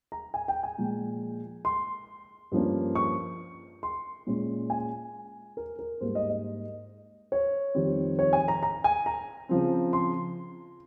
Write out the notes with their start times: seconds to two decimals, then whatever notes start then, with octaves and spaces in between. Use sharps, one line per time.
0.12 A#5
0.34 G#5
0.48 G5
0.63 G#5
0.78 A#2 F3 G#3
1.65 C6
2.52 G2 F3 A#3 C#4
2.95 C#6
3.83 C6
4.27 A#2 G#3 C#4
4.70 G#5
5.57 A#4
5.79 A#4
6.01 G#2 G3 A#3 C5
6.15 D#5
6.30 D#5
7.32 C#5
7.75 F2 D#3 G3 C4
8.19 C#5
8.33 G#5
8.48 A#5
8.63 A#5
8.84 G#5
9.06 A#5
9.49 C#3 F3 C4
9.93 C6